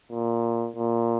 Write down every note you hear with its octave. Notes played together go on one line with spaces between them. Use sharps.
A#2
A#2